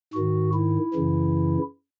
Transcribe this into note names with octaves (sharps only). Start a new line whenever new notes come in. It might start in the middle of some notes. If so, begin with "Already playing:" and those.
G#2 D#3 F#4
E4
F#2 C#3 E3